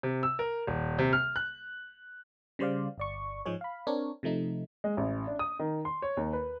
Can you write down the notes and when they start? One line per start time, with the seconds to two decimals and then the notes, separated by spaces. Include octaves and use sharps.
0.03 C3
0.23 E6
0.39 A#4
0.67 D#1
0.99 C3
1.13 F6
1.36 F#6
2.59 C#3 G3 C5 D5 F5
2.98 G1 D5 C#6
3.45 G#2 F3 G#3 G#4 C#5
3.61 F5 B5
3.87 C4 D4 A#4 C#5
4.23 C3 F3 A3 D#4
4.84 G#3
4.97 A1
5.27 D4
5.39 D#6
5.59 D#3
5.85 C6
6.02 C#5
6.17 D#2
6.33 B4